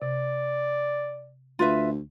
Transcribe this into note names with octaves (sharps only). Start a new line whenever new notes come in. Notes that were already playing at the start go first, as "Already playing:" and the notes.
C3 D5
D2 F4 B4 E5